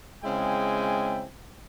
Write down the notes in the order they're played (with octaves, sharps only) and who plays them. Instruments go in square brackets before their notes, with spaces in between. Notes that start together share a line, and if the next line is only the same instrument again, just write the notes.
[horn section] C#3 G#3 C4 E4 G5 G#5